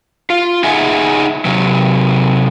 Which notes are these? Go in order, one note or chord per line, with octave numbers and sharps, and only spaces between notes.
F4
D#4 G#4 D#5 E5 F#5 G#5
C3 F#3